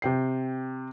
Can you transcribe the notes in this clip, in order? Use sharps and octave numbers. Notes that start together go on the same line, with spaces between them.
C3 G5 C7